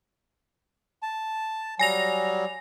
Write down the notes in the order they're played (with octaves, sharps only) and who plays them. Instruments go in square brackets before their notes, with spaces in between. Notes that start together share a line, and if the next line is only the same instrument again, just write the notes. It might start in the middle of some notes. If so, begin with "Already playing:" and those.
[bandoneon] A5
[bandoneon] F#3 G3 [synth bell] G#5 A#6 F7